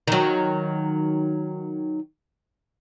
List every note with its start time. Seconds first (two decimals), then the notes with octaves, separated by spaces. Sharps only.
0.07 D#3 F#3